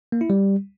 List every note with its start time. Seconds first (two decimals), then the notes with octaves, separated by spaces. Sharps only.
0.12 A#3
0.21 E4
0.30 G3